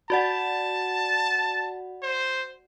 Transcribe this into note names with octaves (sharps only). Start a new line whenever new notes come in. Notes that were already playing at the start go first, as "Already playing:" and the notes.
F#4 D5 F#5 A5
C5